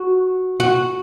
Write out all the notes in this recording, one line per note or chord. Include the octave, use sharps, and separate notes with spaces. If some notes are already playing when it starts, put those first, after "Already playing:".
Already playing: F#4
F#4